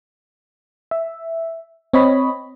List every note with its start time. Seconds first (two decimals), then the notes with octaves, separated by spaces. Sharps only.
0.91 E5
1.93 C4 C#5 D#5 B5